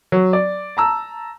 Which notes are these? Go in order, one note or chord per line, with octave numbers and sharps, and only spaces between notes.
F#3
D5
A5 A#5 E6